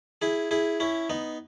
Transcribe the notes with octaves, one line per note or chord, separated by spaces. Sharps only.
E4 G#4
E4 G#4
C#4 E4
B3 D#4